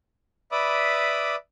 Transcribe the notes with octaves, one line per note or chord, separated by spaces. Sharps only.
B4 D5 E5 B5 D6 D#6